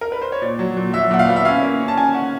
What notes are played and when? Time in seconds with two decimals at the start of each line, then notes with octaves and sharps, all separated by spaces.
0.01 A#4
0.12 B4
0.22 C5
0.32 C#5
0.42 A#2 D5
0.59 F#3
0.77 A#2
0.93 F#3 E5
1.11 A#2 F#5
1.19 F5
1.28 B3
1.36 E5
1.45 C#4 F5
1.63 A#3
1.80 C#4
1.88 A5
1.97 C#4 G#5
2.14 C#4 F#5